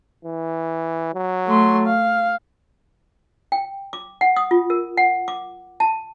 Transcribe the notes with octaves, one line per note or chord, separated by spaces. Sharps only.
E3
F#3
A3 C6
F5
G5
D6
F#5
D#6
F4
A#4
F#5
D6
A5